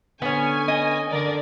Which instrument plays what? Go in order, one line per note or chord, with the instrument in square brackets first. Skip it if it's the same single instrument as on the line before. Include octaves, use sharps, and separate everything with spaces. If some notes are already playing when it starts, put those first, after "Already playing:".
[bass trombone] D3 [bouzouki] B3 C#4 [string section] G#5
[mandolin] D#5
[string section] D3 A#4 D5